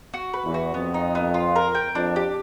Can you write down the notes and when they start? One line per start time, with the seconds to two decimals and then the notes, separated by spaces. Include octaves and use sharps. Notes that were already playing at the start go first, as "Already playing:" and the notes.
0.14 F#4
0.34 B4
0.44 E2
0.54 F#4
0.74 F2 B3
0.94 D#4
1.15 B3
1.34 F4
1.56 A#4
1.75 G5
1.95 F2 D4
2.16 G4